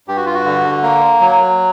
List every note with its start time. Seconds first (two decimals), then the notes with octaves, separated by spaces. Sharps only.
0.08 G2 G4
0.17 F#4
0.26 F4
0.34 F#4
0.45 D3
0.83 A#3
1.21 F#3